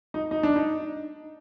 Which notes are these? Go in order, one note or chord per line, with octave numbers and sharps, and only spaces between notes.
D#4
D#4
D4
D#4